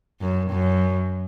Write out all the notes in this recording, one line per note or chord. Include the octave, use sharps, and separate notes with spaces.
F#2
F#2